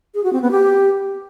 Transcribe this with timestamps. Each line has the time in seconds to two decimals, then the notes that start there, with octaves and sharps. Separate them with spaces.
0.15 G#4
0.24 F#4
0.33 C4
0.42 B3
0.51 G4